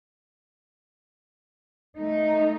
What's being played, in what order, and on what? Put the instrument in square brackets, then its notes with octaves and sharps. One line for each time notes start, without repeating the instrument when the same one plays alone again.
[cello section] A3 D#4